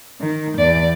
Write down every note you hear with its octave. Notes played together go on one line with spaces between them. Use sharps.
D#3
E2 D5